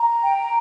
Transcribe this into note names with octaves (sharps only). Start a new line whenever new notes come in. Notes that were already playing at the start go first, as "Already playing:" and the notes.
Already playing: A#5
G5